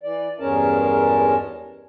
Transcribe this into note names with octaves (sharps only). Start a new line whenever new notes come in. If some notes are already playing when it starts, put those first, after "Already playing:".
E3 D5
E2 G2 G#3 C#4 A#4 A5